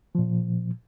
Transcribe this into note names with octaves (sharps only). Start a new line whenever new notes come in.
A#2 F3